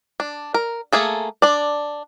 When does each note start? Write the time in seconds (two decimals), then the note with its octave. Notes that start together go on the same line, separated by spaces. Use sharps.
0.20 D4
0.54 A#4
0.92 A3 A#3 G#4 A4
1.42 D4 D5